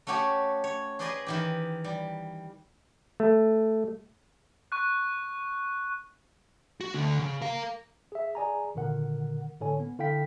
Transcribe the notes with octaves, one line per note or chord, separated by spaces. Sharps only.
A3 C#4 F#4 G4 C#5
C#5
G#4 B4 C5 D5 D#5 G#5
D#3 E3 G4
G3
A3
C#6 F#6
F#4
D2 D3
C#3
A#4 F5
G#4 E5
G#4 D5 G#5 A#5
G#1 A#2 D3 D#3 A#4 F#5
A2 D3 A4 C#5 G#5
B3
D3 E4 A4 F5 G5 B6